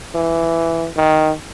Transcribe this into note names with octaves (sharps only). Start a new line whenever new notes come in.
E3
D#3